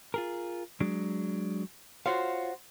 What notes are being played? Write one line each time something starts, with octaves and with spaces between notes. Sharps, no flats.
F4 G#4 A#4
F#3 G#3 D4
F4 F#4 C5 C#5 F5